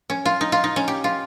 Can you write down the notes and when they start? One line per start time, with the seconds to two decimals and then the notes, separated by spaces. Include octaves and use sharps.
0.10 C#4
0.25 F4
0.41 D#4
0.52 F4
0.64 D#4
0.76 C#4
0.88 G4
1.04 F4